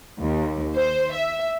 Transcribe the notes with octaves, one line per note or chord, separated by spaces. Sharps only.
D#2
C5
E5